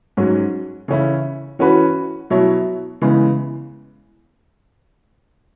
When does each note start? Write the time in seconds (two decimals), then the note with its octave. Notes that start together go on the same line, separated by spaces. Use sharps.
0.17 G#2 F#3 C#4
0.88 C#3 E3 C#4 E4
1.59 E3 C#4 F#4 B4
2.30 B2 F#3 E4 C#5
3.02 C#3 E3 G#3 B3